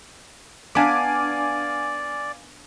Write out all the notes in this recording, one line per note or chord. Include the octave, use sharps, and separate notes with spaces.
B3 D4 D5 F5 G#5 D6